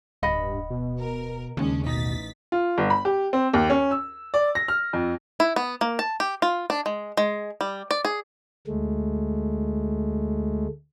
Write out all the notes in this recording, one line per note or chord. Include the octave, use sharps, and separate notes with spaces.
D1 G2 D#5 F#5 B5
B2
A#4
D#2 C#3 G#3 C#4 D4
A1 B2 D#4 A6 B6
F4
G1
B5
G4
C4
D#2
C#4
E6
D5
A#6
F6
F2
E4
B3
A#3
A5
G4
F4
D4
G#3
G#3
G3
D5
G#4
D2 G#3 A3